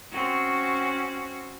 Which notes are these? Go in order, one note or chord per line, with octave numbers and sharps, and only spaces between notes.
C4 C#4 F#4